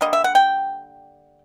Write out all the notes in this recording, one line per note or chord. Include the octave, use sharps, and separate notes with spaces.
D3 G3 A#3 D#5
E5
F#5
G5